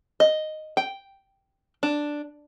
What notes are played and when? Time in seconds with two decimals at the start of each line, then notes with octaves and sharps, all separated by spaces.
0.20 D#5
0.77 G5
1.83 D4